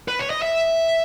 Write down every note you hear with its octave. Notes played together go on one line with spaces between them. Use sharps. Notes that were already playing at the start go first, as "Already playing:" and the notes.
B4
C#5
D#5
E5